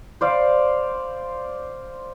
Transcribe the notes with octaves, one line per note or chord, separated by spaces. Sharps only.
C5 D5 F5